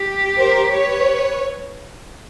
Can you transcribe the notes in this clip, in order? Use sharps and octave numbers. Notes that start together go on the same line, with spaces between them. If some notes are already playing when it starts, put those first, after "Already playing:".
Already playing: G4
A#4 C5
B4 C#5